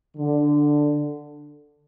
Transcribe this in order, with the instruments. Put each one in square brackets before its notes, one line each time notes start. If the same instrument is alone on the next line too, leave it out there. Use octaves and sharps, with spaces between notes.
[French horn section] D3